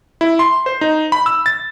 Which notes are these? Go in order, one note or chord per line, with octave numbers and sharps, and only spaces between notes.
E4
C6
C5
D#4
B5
E6
A6